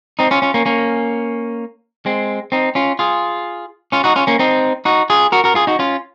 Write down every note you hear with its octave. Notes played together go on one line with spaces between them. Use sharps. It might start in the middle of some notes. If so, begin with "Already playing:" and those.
C4 D#4
C#4 F4
C#4 F4
A#3 C#4
A#3 C#4
G#3 C4
C4 D#4
C#4 F4
F4 G#4
C#4 F4
D#4 F#4
C#4 F4
A#3 C#4
C4 D#4
D#4 F#4
F4 G#4
F#4 A#4
F#4 A#4
F4 G#4
D#4 F#4
C#4 F4